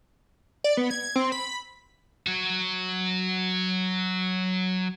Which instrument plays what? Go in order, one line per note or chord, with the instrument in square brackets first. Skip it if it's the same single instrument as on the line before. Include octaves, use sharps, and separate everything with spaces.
[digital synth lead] D5
B3
G#6
G#6
C4
B5
[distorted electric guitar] F#3 F#4